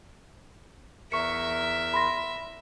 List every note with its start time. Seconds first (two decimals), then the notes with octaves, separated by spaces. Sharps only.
1.12 E2 A#4 E5 C#6 C#7
1.94 B5 C6 A#6